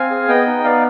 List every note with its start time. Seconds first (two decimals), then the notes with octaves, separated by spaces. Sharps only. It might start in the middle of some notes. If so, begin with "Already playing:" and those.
Already playing: C4 F5 G#5
0.11 G#4
0.28 B3 D#5 G5
0.47 D#4
0.64 B3 D5 F5